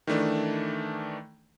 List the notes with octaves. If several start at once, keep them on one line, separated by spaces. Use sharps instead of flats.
D#3 E3 A3 D4